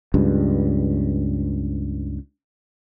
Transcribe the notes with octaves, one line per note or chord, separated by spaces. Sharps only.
C#2 G2